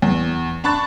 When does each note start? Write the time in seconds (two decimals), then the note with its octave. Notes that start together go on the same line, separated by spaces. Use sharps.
0.02 E2
0.64 D4 A5 B5 C#6 F#6 A6